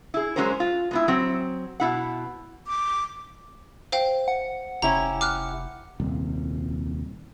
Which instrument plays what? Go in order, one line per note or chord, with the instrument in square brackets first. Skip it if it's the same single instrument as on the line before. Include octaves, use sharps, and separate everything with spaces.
[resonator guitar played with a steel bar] E4 G#4
F#3 G#3 C#4 F#4 A#4 C5
F4
G#3 B3 E4
F#3 C4
B2 E4 F#5
[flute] D6
[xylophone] C5 F5 G5
[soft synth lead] F#5
[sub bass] F1 [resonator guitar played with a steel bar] C#4 E4 G4 [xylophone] A#5
[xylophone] D6 F6 F#6
[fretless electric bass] D#1 C2